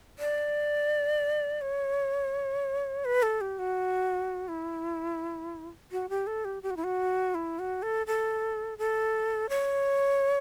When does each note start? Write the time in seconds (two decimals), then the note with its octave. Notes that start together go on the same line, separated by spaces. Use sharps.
0.19 D5
1.61 C#5
3.05 B4
3.23 A4
3.41 G4
3.59 F#4
4.48 E4
5.92 F#4
6.10 G4
6.27 A4
6.45 G4
6.63 G4
6.71 F#4
6.77 E4
6.84 F#4
7.35 E4
7.59 F#4
7.82 A4
8.07 A4
8.78 A4
9.49 C#5